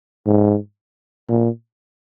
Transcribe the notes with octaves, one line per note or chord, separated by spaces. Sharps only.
G#2
A#2